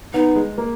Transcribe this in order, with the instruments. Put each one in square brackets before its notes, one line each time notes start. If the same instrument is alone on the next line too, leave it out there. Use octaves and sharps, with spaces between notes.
[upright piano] B3 [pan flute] D#4
[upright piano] G#3
A#3